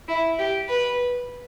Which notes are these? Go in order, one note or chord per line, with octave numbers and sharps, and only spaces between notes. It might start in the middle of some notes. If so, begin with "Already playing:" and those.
E4
G4
B4